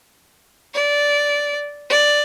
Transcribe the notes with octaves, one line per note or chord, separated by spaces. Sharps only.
D5
D5